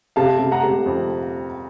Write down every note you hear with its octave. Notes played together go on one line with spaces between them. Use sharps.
C3 F5 A5
C3
F#5 A#5
C3
F2